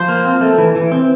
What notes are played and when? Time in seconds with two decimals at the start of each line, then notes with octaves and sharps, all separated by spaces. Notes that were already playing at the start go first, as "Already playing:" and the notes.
Already playing: F3 C5
0.08 A#3
0.25 C4
0.41 A3
0.58 E3
0.75 E3
0.92 C4